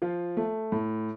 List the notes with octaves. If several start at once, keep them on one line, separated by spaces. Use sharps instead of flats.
F3 F4
A3
A2